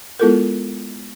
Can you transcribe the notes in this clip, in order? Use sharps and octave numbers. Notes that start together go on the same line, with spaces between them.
G#3 B3 E4 F4 A4 A#4